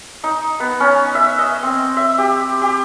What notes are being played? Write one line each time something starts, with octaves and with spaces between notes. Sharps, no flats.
D#4
B3
C#4
E5
D#5
C4
E5
G4
G4